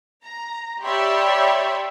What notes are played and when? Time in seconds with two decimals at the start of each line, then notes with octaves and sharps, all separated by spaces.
0.24 A#5
0.84 G4 C#5 D5 E5 B5 C6